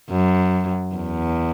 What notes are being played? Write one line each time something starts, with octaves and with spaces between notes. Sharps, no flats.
F#2
E2